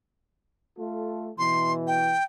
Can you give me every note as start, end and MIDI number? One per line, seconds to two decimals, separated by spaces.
0.78 1.31 57
0.78 1.31 65
0.78 1.31 69
1.38 2.17 47
1.38 2.17 52
1.38 1.73 84
1.87 2.24 79